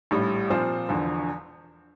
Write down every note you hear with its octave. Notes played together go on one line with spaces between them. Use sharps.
A#1 A2 G3
A#2 F3 C4 F4 C5
E1 E2 D3 F3